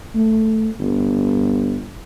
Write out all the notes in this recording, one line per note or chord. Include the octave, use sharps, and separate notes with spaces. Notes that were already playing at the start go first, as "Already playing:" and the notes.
A3
G1